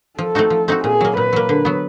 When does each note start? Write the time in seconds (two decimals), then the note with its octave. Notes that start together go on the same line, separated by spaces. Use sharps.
0.18 F3 A4
0.35 A3 C4 D#4 F#4
0.50 F3
0.68 A3 C4 D#4 F#4
0.84 A#2 G#4
1.01 F#3 A#3
1.17 A#2 B4
1.33 F#3 A#3
1.49 D3
1.65 F#3 B3